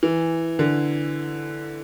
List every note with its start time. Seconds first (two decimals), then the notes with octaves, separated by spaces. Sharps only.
0.03 E3
0.59 D3